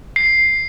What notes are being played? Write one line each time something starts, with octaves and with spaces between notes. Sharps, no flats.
C7